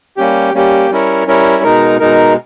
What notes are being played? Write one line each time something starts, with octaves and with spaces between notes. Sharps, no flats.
G3 A#3 C#4 G4
G3 A#3 C#4 G4
G3 C#4 E4 A#4 C#5
G3 C#4 E4 A#4 C#5
B2 G#3 D#4 A#4
B2 G#3 D#4 A#4